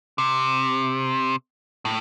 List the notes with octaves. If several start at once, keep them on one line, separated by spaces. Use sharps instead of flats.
C3
A2